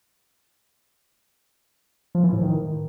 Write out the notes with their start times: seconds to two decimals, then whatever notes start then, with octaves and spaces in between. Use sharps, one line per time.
2.15 F3
2.24 E3
2.33 A2
2.41 D#3